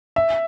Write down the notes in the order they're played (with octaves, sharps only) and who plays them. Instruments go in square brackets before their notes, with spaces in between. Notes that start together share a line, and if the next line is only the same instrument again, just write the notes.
[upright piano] E5